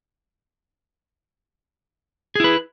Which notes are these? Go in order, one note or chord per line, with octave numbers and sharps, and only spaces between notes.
E4 G#4 B4